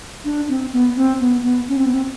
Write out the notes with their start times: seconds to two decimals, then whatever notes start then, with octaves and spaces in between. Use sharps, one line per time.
0.24 D4
0.49 C4
0.73 B3
0.96 C4
1.20 B3
1.44 B3
1.68 C#4
1.77 C4
1.85 B3
1.93 C4